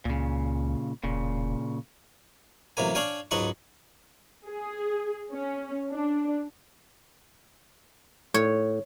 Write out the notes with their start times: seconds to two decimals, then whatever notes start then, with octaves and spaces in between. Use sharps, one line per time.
0.05 C#2 A#2 C#3
1.04 E1 A#2 C#3
2.77 A1 C3 F#3 A#3 G#5
2.95 D4 C#5 F5 G5 G#5
3.31 C#2 G#2 F#3 D#5 F#5 C#6
4.47 G#4
5.32 C#4
5.91 D4
8.34 A2 C#5